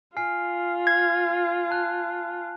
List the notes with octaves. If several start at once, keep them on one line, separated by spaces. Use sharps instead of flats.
F4 G#5 F6 C7
G#6
A5 F#6